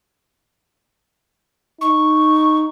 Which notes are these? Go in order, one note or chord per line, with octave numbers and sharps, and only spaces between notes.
D#4 C#6